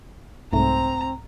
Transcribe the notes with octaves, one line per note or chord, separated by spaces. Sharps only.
C2 G#2 A3 C4 A#5